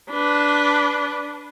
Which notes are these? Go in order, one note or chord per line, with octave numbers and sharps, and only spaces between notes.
D4 B4